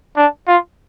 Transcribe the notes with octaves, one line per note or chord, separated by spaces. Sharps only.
D4
F4